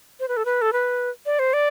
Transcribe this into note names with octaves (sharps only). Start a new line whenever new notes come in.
C5
B4
A4
B4
A4
B4
D5
C5
D5